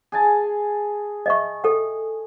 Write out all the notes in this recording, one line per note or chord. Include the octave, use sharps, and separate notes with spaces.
G#4 G#5 A5
D#5 E5 C#6
A4 G5